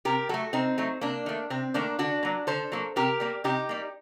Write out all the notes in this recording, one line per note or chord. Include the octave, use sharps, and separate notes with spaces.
C3 G4 A#4
F#3 A3 F#4 A4
C3 C4 D#4
F#3 A3
C3 A#3 D4
D#3 A3
C3 C4
D#3 A3 A#3 D4
D3 D4 F#4
F#3 A#3
D3 A4 C5
F#3 A#3
C3 G4 A#4
G3 A#3
C3 D#4 G4
G3 A#3